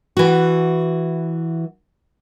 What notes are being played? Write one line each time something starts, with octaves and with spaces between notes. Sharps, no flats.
E3 F#4